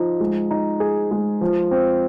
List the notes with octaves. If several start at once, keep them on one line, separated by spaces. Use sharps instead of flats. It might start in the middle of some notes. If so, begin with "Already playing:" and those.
Already playing: F3 D#4
G#3
D#4
G#4
G#3
F3
C4